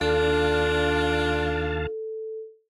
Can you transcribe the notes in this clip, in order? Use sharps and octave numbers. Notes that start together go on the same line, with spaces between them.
D#2 D4 F4 A4 F5 A5